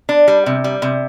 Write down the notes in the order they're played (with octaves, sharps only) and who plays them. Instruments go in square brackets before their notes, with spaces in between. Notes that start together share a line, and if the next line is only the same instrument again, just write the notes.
[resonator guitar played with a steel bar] D4
G3
C3
G3
C3